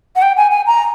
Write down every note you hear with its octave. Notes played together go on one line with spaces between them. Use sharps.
F#5
G5
G#5
G#5
A#5